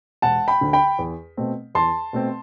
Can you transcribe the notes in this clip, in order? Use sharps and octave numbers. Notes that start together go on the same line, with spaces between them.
E1 F#5 A5
G5 B5
D2 D3
G5 B5
E2
B2 A3 C4
E2 A5 C6
B2 A3 C4